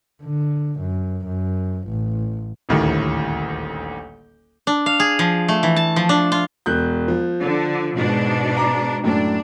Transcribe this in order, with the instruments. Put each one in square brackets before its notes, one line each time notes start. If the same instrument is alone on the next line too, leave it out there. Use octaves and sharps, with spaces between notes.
[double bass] D3
F#2
F#2
A1
[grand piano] D#1 A1 D2 A2 D#3
[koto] D4
F5
G#4
F3
A3
E3
A5
F3
D4
F4
[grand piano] E1 F#6 G6
F3
[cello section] D3
G#2 B2 D4
[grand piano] A#5 D6
[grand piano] F#2 A2 [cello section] D4